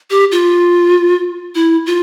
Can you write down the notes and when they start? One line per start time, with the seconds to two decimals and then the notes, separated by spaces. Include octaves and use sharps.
0.10 G4
0.32 F4
1.55 E4
1.86 F4